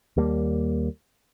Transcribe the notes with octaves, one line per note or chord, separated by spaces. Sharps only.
D#2 G3 A#3